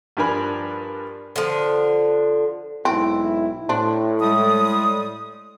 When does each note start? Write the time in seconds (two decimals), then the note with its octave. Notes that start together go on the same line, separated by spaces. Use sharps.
0.17 G2 F3 D4 A#4 G#5 B5
1.36 D3 F3
2.85 B1 G#2 C4 E4
3.69 A2 D4 C5
4.21 G3 G#3 D#6